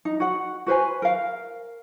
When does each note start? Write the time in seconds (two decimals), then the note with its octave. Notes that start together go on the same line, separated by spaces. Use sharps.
0.05 D#4
0.20 F#4 F#5
0.67 F#4 B4 C5 G#5
1.02 A#4 F5